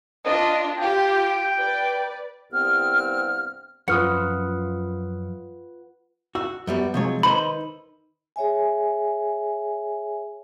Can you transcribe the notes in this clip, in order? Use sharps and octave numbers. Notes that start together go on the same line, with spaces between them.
D4 F4 D#5
F4 G4 G5
B4 D5
C2 G2 B3 C4 C5 F6
F#2 F3 F4 B4 F#5 D#6 F6 C#7
F#4 E6
F#2 G3 B3
C3 F3 F#3 G#3 C#5
D#3 D#4 B4 C5 B5
G#4 C#5 E5 G#5